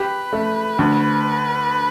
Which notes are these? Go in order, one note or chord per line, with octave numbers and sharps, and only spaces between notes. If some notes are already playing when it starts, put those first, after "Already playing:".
Already playing: G4 B4
A3
D2